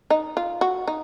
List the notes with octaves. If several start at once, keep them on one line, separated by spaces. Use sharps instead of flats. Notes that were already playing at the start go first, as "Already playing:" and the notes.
D#4
F4
F#4
D#4